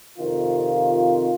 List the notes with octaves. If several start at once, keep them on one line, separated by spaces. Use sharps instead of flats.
F2 C3 D#3 F4